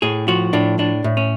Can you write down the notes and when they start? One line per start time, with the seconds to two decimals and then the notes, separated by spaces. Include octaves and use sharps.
0.02 A2 G#4
0.28 F3 F#4
0.53 A2 D4
0.79 A2 D4
1.04 A2
1.17 C#4